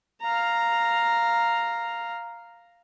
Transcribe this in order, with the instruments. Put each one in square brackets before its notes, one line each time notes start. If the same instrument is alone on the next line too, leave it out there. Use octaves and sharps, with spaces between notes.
[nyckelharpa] F5 A#5